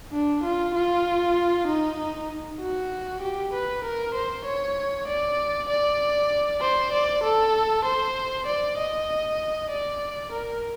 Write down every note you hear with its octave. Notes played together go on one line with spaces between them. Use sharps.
D4
F4
F4
D#4
F#4
G4
B4
A#4
C5
C#5
D5
D5
C5
D5
A4
C5
D5
D#5
D5
A#4